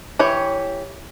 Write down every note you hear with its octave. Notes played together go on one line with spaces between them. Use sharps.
E3 G4 C#5